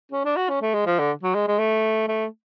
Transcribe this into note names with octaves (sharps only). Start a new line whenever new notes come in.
C#4
D4
F#4
C#4
A3
G#3
F3
D3
F#3
G#3
G#3
A3
A3